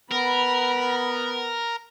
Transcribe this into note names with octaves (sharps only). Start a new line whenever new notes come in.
B3 A#4 B5